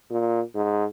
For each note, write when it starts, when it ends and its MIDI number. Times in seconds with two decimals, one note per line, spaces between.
0.10 0.41 46
0.55 0.85 44